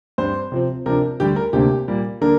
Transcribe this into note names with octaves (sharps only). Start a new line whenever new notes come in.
G2 G3 C4 C5
C3 F3 C4
C3 F3 D4 A#4
D2 D3 G3 G4
A#4
D2 C3 A#3 D4 G4
A#2 G3 A#3
D3 A#3 D4 A#4